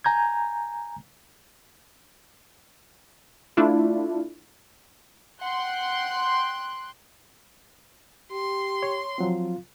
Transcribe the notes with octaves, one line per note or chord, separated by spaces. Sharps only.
G#5 A#5 G6 G#6
A3 D4 E4 F4
F#5 G5 C6 F#6
G4 C6
C#5
F3 F#3 C4 F4